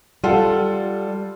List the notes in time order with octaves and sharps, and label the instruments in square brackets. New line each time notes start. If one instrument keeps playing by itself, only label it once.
[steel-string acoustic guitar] G3 [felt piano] F4 A4 F#5